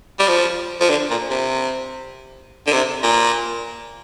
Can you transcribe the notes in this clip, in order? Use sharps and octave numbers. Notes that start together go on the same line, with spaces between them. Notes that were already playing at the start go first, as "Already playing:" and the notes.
G3
F3
F3
D3
A#2
C3
D3
C3
A#2